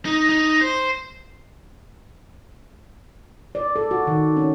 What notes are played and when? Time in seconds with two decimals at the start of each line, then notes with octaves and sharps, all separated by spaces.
0.05 D#4
0.29 D#4
0.61 C5
3.55 D5
3.76 A4
3.91 F#4
4.07 D#3
4.37 C#4